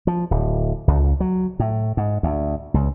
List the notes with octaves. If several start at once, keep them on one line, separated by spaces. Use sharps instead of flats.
F3
D1
C#2
F#3
A2
G#2
D2
C#2